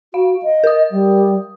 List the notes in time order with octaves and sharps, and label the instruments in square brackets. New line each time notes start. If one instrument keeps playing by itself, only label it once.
[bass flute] F#4 [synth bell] F5
[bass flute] D#5
[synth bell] A#4 D#6
[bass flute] G3